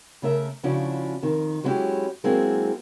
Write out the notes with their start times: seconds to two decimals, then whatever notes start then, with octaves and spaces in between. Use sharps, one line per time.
0.22 C#3 A3 A#4 E5
0.63 C#3 F3 C#4 D4 E4 F#4
1.22 F2 D#3
1.64 F#3 G#3 B3 C#4 E4 G4
2.24 F#3 G#3 A#3 C4 E4 G#4